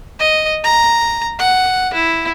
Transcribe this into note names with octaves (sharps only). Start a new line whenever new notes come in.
D#5
A#5
F#5
E4